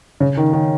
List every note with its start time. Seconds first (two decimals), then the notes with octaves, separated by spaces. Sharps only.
0.20 C#3
0.37 D#3
0.53 D#3